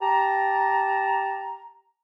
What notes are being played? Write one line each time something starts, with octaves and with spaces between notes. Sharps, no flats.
G4 A5 A#5